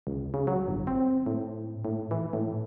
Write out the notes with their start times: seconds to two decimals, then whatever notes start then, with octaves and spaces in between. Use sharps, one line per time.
0.07 C#2
0.34 C#3
0.47 F#3
0.68 G1
0.87 C4
1.26 A2
1.85 A2
2.11 E3
2.33 A2